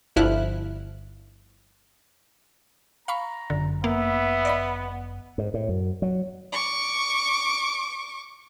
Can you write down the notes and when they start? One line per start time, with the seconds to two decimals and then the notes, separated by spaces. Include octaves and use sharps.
0.16 G1 F3 E4 F6 F#6
3.08 F5 A#5 B5 C#6
3.50 G1 F#2 D3
3.84 A#3 B3 E5
4.45 D5 D#5 B5
5.38 G#2
5.54 A2
5.69 F#2
6.02 F#3
6.52 C#6 D6